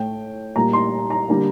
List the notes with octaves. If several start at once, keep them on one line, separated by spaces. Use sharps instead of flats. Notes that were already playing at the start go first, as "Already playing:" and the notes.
Already playing: A2 A3 G5
A#2 G3 A#3 A#5
C6
A#5
D3 G3 A#3